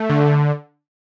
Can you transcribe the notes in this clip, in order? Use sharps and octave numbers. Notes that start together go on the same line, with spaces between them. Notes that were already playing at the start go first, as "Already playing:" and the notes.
Already playing: A3
D3